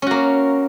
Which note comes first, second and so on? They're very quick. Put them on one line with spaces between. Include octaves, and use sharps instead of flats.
C#4 F#4 A#3